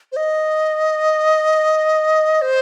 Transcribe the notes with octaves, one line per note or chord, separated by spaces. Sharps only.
C5
D#5
C5